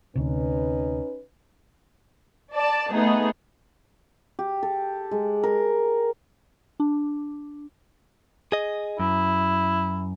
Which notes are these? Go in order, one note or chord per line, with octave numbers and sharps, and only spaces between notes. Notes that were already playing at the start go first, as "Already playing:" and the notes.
D2 C3 C#4 D#4 B4
D5 A5
A3 B3 D#4 G#4
G4
A4
G#3
A#4
D4
G#4 D#5
F#2 E4